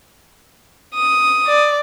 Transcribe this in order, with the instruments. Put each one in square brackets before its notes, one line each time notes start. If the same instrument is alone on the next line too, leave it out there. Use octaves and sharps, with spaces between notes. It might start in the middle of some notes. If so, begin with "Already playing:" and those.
[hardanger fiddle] D#6
[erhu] D5